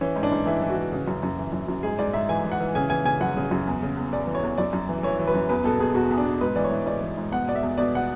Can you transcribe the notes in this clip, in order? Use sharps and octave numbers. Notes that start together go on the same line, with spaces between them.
E3 C#4
G#2
D4
G#2
E3 E4
E3
F#4
E3
C#3
F#2
F#2
E3
F#2
F#2
G#2 G#4
G#2 D5
G#2 E5
E3 G#5
E3
F#5
E3
C#3 G#5
E3 G#5
C#3 G#5
F#2 F#5
C#3
F#2
E2
C#3
E2
E2 D5
E3
C#5
E2
F#2 D5
F#2
E3
E3 C#5
E3
B4
F#2
E2 B4
B2 A4
B2 G#4
E2 F#4
E2
D4
B2
G#2 B4
E3 D5
C#5
E3
G#2 D5
E3
G#2
B2 F#5
B2 D5
E5
E2
B2 D5
F#5